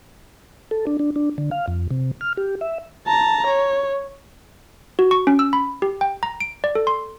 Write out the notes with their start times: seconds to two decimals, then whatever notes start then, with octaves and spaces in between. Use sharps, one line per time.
0.71 A4
0.87 D4
0.99 D4
1.16 D4
1.38 D3
1.51 F5
1.68 F2
1.91 C3
2.21 F6
2.37 G4
2.61 E5
3.07 A5 A#5
3.46 C#5
4.99 F#4
5.11 C#6
5.27 C#4
5.39 E6
5.53 B5
5.82 G4
6.01 G5
6.23 A#5
6.40 D7
6.64 D5
6.75 A4
6.87 C6